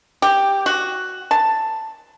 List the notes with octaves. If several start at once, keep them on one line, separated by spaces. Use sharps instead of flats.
G4
F#4
A5